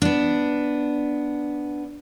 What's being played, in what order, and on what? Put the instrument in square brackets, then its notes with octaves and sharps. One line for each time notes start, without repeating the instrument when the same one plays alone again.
[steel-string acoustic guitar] B3 D4